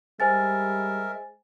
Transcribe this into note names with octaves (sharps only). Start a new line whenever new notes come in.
G3 G#3 A#4 C5 E5 G#5 A6